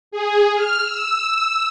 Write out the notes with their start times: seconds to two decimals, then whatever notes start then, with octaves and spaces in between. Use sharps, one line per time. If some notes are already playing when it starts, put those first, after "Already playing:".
0.11 G#4
0.55 F6
0.84 E6